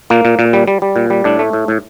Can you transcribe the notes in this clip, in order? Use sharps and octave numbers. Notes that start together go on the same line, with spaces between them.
A#2 A#3
A#2
A#2
G3
G3
G3
A#2
G3
A2 D4
A3
A2
A2